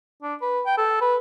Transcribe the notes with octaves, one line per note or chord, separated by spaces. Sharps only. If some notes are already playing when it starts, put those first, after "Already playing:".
D4
B4
G5
A4
B4